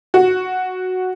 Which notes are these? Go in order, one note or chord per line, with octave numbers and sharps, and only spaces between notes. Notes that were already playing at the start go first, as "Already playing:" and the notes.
F#4